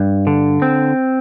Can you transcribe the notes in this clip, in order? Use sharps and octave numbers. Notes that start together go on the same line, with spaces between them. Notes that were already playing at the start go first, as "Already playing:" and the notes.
Already playing: G2
D3
C4